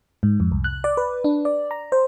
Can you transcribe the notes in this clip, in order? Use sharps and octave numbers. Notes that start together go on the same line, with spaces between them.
G#2
F2
C2
F#6
D5
B4
D4
D5
A#5
C5